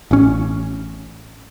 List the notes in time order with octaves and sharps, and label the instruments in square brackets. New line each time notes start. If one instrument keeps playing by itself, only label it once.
[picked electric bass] A1 C#4